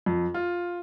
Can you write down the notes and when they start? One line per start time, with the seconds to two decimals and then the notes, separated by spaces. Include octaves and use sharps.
0.06 F2
0.34 F4